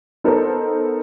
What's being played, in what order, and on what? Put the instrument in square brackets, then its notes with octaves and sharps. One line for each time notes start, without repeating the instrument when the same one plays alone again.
[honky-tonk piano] B3 D#4 A4 A#4 C5